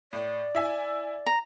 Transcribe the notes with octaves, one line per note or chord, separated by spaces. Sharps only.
A2 D5
E4 E5 G#5
A#5